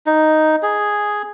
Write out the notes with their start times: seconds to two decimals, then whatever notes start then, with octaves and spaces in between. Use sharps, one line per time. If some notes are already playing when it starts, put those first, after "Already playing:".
0.06 D#4
0.63 G#4